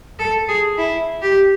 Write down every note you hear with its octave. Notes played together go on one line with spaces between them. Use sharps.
A4
G#4
E4
G4